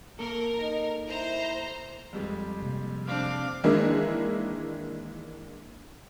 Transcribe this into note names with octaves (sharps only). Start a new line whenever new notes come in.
A#3 A4 A#4
D#4
E4 C5 A#5
F2 G3 G#3
C3 F3 A#3
C4 D4 F5 D6
D#3 E3 G#3 A#3 D4 E4